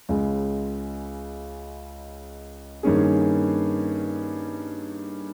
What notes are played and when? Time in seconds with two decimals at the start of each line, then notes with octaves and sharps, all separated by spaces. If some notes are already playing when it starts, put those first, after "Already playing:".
0.09 C#2 C#3 G#3
2.83 G2 D#3 A#3 C#4 G#4